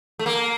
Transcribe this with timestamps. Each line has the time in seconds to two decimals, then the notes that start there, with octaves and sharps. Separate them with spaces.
0.19 A3
0.26 A#3